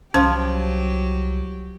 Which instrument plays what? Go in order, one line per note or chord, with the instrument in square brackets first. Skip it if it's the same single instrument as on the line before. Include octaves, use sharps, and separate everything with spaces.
[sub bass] C2 [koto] F3 [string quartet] F#3 G4 [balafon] C#4